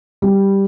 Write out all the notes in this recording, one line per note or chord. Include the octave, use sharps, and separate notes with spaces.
G3